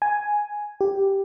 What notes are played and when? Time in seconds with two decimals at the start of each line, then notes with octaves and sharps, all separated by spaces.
0.02 G#5
0.81 G4